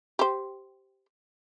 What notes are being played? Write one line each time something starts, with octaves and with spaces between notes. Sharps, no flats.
G4 C5